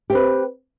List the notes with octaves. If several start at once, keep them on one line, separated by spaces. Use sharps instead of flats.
C4 G4 B4